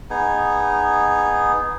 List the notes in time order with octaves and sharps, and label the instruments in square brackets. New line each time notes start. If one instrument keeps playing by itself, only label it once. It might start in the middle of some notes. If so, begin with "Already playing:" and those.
[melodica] B3 D#4 G#4